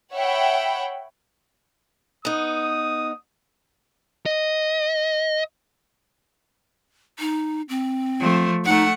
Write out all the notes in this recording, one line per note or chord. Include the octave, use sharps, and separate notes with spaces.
C#5 E5 F#5 G5 B5
B3 D#4 D#6
D#5
D#4
C4
F3 A3
A3 D#4 F#5